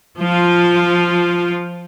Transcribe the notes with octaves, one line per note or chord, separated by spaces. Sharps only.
F3 F4